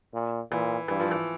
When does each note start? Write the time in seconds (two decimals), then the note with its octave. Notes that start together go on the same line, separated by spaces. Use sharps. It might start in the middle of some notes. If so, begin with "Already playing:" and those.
0.14 A#2
0.51 A#2 E3
0.88 G2 E3
1.00 F3
1.11 E3